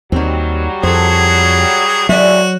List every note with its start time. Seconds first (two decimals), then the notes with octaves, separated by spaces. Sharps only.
0.12 D#2 D#3 F#3 G3 C4
0.83 F2 G#4 A4 C5
2.09 D#2 A2 F#3 G#3 F#4 D5 E5